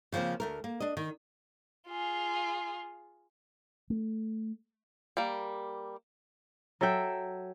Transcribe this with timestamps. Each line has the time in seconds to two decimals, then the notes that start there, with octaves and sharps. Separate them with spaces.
0.12 C#3 F3 G3 A#3 C4
0.40 D2 A3 A#4
0.64 A#3
0.80 D4 D#5
0.97 D#3
1.88 F4 G#4
3.90 A3
5.17 G3 A#3
6.81 F#3 A4 E5 G5